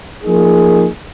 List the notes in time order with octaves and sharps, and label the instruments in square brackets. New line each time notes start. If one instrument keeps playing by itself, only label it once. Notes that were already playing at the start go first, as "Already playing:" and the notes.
[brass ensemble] F3 A#3 D#4 G#4